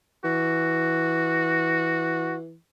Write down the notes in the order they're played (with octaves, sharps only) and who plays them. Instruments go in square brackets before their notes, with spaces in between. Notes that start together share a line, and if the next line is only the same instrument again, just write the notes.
[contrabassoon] E3 [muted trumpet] F#4